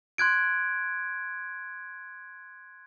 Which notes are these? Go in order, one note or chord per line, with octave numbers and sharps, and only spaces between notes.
C6 F#6 G#6 D7